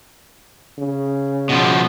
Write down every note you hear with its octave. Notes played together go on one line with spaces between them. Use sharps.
C#3
B2 F3